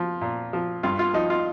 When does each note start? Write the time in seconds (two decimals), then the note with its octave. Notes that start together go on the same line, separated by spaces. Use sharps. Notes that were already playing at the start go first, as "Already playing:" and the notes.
Already playing: F3
0.21 A#2
0.53 F3
0.83 G2 F4
0.99 F4
1.14 F3 D#4
1.30 F4